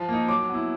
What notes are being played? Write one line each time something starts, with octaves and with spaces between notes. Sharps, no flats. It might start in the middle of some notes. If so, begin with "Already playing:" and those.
Already playing: F3
A#3 D#4
F#3 D6
B3 E4